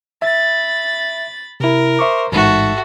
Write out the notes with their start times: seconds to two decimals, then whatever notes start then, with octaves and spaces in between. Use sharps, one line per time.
0.22 E5 B5 A6
1.60 C3 E4 A#4
1.99 C5 E5 C#6 D6
2.32 A1 G#2 F#4 A4 E5